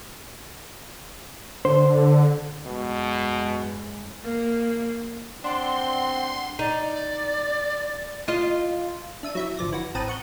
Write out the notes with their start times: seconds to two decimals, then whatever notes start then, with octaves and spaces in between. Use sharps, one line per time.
1.65 D3 C5
2.66 F#2 B2 G#3
4.23 A#3
5.44 C4 D4 F#5 C6
6.59 D#4 D5
8.28 F4 D#5
9.23 D4 E5 D#7
9.35 F#3 E4 E5
9.57 G1 F3 D5 A#6
9.73 E3 F#4 A#6
9.95 A1 C4 B4 A5 A#5 D#6
10.08 F#5 C#6 F#6 G6